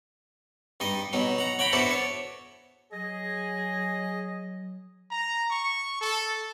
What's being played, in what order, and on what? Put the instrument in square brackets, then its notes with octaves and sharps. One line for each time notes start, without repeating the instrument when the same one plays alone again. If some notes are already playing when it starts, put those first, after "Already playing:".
[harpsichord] G2 D#4 D#5
B2 F#3 D#4
F#5 A#5
C#5 F#5 G5 A#5 B5
B3 D4 E4 F#4 A4 C5
C#5
[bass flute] F#3 [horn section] G#4 [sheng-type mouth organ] D#5
[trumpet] A#5
C#6
A4